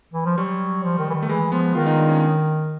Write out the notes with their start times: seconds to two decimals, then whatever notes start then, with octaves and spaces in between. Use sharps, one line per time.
0.14 E3
0.26 F3
0.38 F#3 G3
0.83 F3
0.99 D#3
1.10 E3
1.14 D#3
1.22 A3
1.29 E3 G#3
1.52 F3 B3
1.75 D#3 F4
1.87 D#4
1.97 D4
2.09 C#4